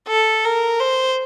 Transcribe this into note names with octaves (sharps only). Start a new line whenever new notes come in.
A4
A#4
C5